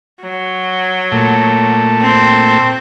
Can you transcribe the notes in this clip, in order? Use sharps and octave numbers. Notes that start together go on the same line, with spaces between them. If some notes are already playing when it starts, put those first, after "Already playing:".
F#3
A#2 A3
C4